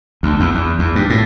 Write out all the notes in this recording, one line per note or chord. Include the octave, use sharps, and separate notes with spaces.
D2
E2
E2
E2
G2
A2